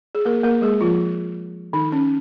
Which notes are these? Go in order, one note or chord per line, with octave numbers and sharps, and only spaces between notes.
G#4
A#3 A#4
A#3 A#4
G#3 G#4
F3 F4
D#3 D#4
C#4